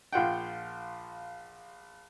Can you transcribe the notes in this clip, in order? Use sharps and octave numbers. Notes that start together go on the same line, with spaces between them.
A#1 F4 F#5 G5